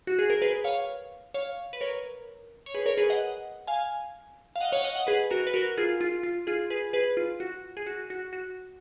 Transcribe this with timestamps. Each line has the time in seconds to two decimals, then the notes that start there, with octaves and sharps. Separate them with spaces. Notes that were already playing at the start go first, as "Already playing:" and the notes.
0.07 F#4
0.19 G#4
0.30 A#4
0.42 G#4 B4
0.64 C#5 F5
1.34 C#5 F5
1.73 B4
1.81 A#4 C#5
2.66 C#5
2.75 G#4 B4
2.86 A#4 C#5
2.98 G#4 B4
3.10 D#5 F#5
3.67 F5 G#5
4.56 F5
4.61 D#5 F#5
4.72 C#5 F5
4.84 D#5 F#5
4.95 D#5 F#5
5.07 G#4 B4
5.31 F#4 A#4
5.47 B4
5.54 F#4 A#4
5.78 F4 G#4
6.01 F4
6.23 F4
6.47 F4 G#4
6.70 G#4 B4
6.93 G#4 B4
7.17 F4
7.40 F#4
7.77 G#4
7.87 F#4
8.10 F#4
8.33 F#4